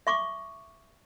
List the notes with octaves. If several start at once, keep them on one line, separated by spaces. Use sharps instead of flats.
E5 C#6 D6